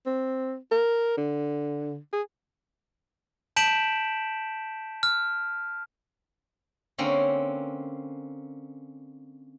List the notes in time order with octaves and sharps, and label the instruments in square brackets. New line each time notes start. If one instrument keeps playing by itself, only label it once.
[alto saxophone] C4
A#4
D3
G#4
[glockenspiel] A5 G6 B6 D7 E7 F#7
F6
[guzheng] D3 A#3 C4 C#4